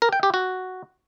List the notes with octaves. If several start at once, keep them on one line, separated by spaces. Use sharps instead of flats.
A#4
G5
G4
F#4